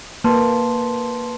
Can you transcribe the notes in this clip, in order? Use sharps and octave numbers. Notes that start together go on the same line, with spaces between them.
A#3 B4 A5 C6